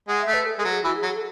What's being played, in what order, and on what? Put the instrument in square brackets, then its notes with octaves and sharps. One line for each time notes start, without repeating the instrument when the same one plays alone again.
[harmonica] G#3 [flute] F#5
[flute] E5
[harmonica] A3
[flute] B4
A4
[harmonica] G#3 [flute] A4
[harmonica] F#3
[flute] G#4
[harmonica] E3 [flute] F#4
[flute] G#4
[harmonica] F#3
[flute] G#4
A4